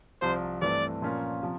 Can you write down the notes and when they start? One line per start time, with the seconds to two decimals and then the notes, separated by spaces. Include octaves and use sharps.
0.22 C2 C3 F3 C5
0.62 G2 E3 A3 C4 D5
1.02 A#2 F3 A#3 C#4 F4
1.42 C3 F3